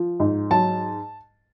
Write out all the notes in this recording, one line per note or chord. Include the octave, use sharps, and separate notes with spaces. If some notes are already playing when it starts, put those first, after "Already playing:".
Already playing: F3
G#2
F#3 A5